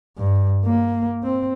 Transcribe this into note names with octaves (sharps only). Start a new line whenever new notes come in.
G2
A#3
C4